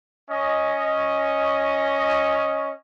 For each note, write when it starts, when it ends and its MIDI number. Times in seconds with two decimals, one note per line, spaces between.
0.30 2.72 61
0.30 2.72 75